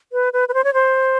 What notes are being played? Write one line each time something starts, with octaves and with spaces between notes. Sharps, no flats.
B4
B4
B4
C5
C#5
C5